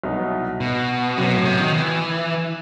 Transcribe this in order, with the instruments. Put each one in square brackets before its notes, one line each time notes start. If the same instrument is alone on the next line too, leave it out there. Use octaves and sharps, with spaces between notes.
[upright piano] C2 B2 F#3 B3 D#4
[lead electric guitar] B2
[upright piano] F#2 F#3 B3 F#4 [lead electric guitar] C3
[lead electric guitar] B2
A2
C3
D#3
E3